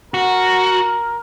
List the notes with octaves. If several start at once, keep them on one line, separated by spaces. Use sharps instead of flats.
F#4 A#4